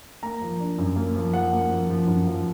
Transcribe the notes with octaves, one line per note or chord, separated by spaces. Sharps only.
A#3 A#5
F3
D4
F#2
A#3
F3
F3 F#5
A#3
F3
F3
F#2
F3